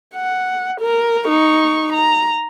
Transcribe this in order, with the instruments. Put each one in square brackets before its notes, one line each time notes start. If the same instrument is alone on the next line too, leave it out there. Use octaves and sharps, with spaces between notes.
[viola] F#5
A#4
D#4 C#6
A#5